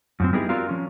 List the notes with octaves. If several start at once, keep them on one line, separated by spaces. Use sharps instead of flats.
F#2 F3 C4
G3 B3 D#4 E4 G4 G#4
C4 F4 F#4 A#4 D5 F5
F3 C#4